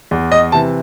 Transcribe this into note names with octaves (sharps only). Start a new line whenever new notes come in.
E2
D#5
C3 E3 A5